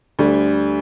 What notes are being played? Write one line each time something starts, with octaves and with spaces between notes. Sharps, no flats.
D2 D3 G3